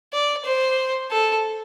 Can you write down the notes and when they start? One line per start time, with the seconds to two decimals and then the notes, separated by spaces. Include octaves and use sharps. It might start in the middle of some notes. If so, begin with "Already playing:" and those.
0.13 D5
0.45 C5
1.11 A4